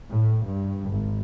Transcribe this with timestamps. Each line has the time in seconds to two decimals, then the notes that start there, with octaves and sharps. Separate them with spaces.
0.11 A2
0.46 G2
0.91 G#1